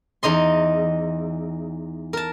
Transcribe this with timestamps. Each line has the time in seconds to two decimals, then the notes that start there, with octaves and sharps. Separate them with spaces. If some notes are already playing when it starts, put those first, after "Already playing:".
0.23 E2 D#4 D#5 C6
2.13 A#4 A5